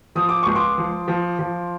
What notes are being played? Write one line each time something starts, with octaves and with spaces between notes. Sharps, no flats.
F3 D#6
D6
C#2 C#6
C6 D6
F3
F3
F3